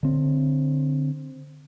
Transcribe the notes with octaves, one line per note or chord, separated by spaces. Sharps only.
D3 C4